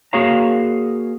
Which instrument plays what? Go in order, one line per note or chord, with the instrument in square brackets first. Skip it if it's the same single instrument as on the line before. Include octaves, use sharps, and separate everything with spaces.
[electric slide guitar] A#3 F#4 G#4 C#5 F5 A#5